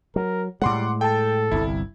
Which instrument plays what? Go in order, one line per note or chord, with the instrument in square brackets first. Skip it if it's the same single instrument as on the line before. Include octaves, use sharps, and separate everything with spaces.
[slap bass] F#3 [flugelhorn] A#4
[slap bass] A2 G#3 [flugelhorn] G3 [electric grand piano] F#5 C6 D6
[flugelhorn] A4 [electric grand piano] G5 A5
[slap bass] G1 C2 [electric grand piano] E4